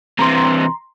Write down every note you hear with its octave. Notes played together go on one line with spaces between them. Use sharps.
C3 E3 A#5 C6